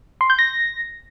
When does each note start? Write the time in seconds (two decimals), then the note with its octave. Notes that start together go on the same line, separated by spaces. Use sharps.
0.21 C6
0.30 G6
0.39 A#6